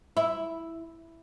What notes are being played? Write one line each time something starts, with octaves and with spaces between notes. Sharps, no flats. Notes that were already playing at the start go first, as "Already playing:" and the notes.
E4